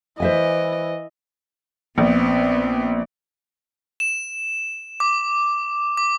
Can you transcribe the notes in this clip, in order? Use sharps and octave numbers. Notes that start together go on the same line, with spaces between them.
E3 C5 D#5 E5 G#5
A#1 B3 C4
E7
D6
D6